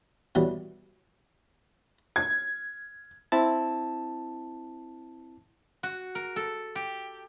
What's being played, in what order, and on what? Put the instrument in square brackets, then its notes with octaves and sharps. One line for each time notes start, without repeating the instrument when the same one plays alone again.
[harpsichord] B2 E3 F#3 G3
[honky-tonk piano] G#6
[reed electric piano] C4 E4 A5
[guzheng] F#4
A#4
A4
G4